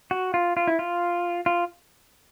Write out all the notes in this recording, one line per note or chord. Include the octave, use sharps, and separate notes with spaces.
F#4
F4
F4
E4
F4
F4